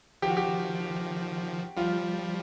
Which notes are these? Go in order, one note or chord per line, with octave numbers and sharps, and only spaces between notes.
D#3 F3 G4
F#4
G4
F3 G3 F4